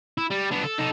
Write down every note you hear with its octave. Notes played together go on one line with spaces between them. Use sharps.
E4
G3
B3 D4
A4
D#4 A4